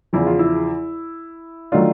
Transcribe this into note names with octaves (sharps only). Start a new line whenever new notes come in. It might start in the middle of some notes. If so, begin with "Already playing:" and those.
E2 C#3 F3 E4
F4
E4
D#3 F#3 A3 D4 F4